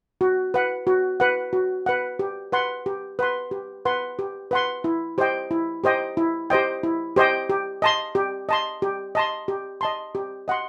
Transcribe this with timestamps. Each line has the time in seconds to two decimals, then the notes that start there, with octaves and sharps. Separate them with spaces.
0.21 F#4
0.54 B4 F#5
0.87 F#4
1.20 B4 F#5
1.53 F#4
1.86 B4 F#5
2.19 G4
2.52 B4 F#5 C6
2.86 G4
3.19 B4 F#5 C6
3.51 G4
3.85 B4 F#5 C6
4.19 G4
4.51 B4 F#5 C6
4.84 E4
5.18 G4 C5 D#5 G5
5.51 E4
5.84 G4 C5 D#5 G5
6.17 E4
6.50 G4 C5 D#5 G5
6.83 E4
7.16 G4 C5 D#5 G5
7.50 G4
7.82 D#5 A5 C6
8.15 G4
8.49 D#5 A5 C6
8.82 G4
9.15 D#5 A5 C6
9.48 G4
9.81 D#5 A5 C6
10.15 G4
10.48 D#5 F#5 C6